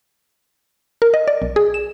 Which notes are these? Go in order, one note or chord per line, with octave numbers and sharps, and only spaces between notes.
A#4
D#5
D5
B1
G#4
E7